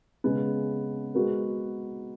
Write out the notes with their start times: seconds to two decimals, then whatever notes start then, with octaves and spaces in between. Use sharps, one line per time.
0.24 C#3 G#3 B3
1.14 G#3 B3 F#4 A#4